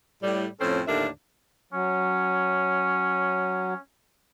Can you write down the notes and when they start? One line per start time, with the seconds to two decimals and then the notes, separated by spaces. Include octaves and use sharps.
0.23 A2 G3
0.61 F2 A2 F3 C4 C#4 A4
0.87 D#2 A2 D3 D4 A#4 E5
1.73 F#3 C#4